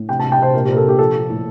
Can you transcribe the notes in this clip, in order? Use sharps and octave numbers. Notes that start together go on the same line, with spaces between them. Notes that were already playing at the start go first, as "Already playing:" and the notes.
Already playing: A2
C3 G5
A5
C3
G5
C3 C5
A#2 A#4
G4
A#2 A#4
A4
A#2 G4
F3 A4
F3
A2